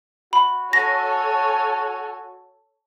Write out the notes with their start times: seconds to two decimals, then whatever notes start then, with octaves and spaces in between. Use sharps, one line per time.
0.33 F#4 B5
0.73 F#4 A4 C#5 G#5 A#6